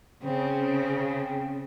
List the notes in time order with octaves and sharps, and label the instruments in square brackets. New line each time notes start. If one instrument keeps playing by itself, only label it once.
[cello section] C#3 [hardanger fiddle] C4